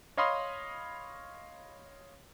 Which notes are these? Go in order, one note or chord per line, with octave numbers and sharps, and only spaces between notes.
C#5 D#5 F5 B5 C6 D#6